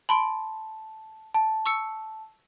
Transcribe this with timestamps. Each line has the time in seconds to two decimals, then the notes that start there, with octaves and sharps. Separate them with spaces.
0.09 A5 B5 C6 D7
1.34 A5
1.66 C#6 E6 C#7